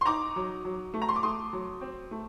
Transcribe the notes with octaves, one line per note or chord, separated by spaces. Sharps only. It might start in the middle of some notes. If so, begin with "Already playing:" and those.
C6
D#4 A#5 D6
F#3
F#3
A3
A#5
C6
D6
A3 C6 D#6
F#3
C4
A3